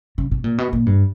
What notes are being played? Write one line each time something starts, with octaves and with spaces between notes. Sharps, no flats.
C#3
B2
A#2
B2
A#2
G2